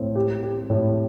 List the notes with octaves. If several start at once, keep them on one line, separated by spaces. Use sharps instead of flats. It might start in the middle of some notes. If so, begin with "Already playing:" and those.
Already playing: A2 C4
G4
G4
A2